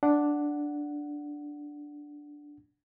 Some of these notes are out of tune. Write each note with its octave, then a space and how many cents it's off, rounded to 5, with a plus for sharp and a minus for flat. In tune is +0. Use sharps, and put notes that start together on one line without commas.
D4 +0 F#5 +0